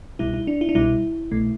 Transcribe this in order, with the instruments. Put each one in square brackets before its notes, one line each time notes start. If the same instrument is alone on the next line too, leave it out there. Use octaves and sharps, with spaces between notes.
[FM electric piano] C2 B2 G3 E4
E4
D4
E4
D4
C2 B2 G3 E4
C2 B2 A3